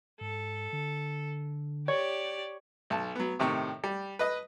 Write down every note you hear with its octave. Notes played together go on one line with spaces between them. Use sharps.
G#2 A4
D3
G4 C#5 D5
B1 A5
F#3 B3
A2 C3 D#3 C#6
G3
B4 D#5 D#6